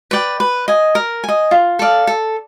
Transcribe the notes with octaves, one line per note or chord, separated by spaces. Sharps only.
B4 D5 G5
B4
D#5 G#5
A#4
D#5 G#5
F4
A4 D5 F5
A4